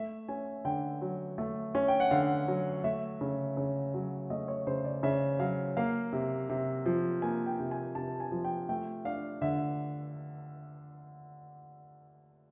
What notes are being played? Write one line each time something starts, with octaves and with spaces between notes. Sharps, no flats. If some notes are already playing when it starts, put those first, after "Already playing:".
Already playing: A3 E5
C#4 G#5
D3 G5
F#3
A3
C#4
G5
F#5
D3 F5
F#3
A3 E5
C#3
C#3
F#3
A3 D#5
C#5
C#3 C5
D5
C#3 E5
F#3 F5
A#3 F5
C3
C3
F3
A#3 G#5
G5
C3
G#5
C3 A5
G#5
F3
G5
A3 G5
D4 F5
D3 E5